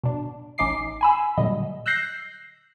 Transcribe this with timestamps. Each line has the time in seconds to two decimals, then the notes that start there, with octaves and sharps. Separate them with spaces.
0.04 B2 D4
0.58 A1 C#4 D#4 D#5 D6 C7
1.01 G#5 B5 E6
1.37 A#2 D3 F#3 G3 D#5
1.86 E6 F#6 G6 A#6 C7